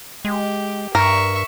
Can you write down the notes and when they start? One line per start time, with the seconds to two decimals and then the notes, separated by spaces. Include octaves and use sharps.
0.25 G#3 G4
0.95 G2 A#4 E5 C#6